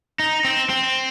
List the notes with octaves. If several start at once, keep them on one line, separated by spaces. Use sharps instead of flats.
D#4
C4
C4